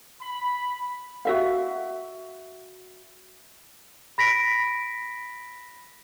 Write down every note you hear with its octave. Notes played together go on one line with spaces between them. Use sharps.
B5
F#4 E5 F5
B5 A#6 B6 D7